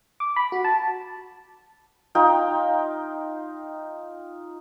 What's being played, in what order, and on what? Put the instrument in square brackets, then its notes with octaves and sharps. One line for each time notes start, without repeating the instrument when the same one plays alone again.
[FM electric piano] D6
B5
F#4
A5
[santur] D#4 F4 G5